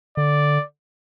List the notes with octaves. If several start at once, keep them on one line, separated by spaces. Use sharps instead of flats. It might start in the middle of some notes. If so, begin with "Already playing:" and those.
D3 D5